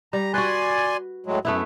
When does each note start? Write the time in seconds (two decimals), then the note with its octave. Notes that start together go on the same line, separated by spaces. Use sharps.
0.13 G3 A#5
0.34 F#4 B4 D5 G#5 C6
1.26 A2 F#3 G#3
1.45 F#2 A3 B3 E4